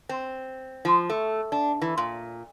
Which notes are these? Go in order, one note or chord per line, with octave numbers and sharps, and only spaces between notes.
C4
F3
A3
D4
E3
A#2